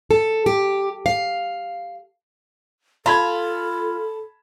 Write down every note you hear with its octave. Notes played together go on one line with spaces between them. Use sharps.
A4
G4
F5
F4 A4 A5 B5 G#6